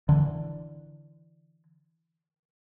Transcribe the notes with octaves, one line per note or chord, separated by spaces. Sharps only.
D3 E3